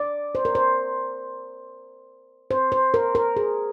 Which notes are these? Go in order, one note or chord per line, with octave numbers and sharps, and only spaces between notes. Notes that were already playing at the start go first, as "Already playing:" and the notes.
Already playing: D5
C5
A#4
C5
C5
C5
A#4
A#4
G#4